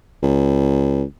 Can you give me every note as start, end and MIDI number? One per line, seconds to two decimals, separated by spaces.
0.23 1.03 37